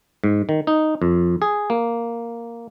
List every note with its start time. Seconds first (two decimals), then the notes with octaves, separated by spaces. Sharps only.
0.24 G#2
0.49 D#3
0.67 D#4
1.02 F2
1.42 G#4
1.70 A#3